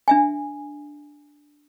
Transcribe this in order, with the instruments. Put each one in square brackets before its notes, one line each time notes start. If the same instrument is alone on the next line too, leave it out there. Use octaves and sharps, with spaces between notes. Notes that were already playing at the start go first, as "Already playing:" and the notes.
[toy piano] D4 E5 G#5